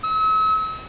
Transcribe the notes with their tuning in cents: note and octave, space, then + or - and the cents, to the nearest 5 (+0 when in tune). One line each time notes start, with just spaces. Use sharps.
E6 -40